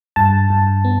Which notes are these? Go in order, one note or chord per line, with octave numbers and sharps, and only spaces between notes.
G2 A5
G2
B3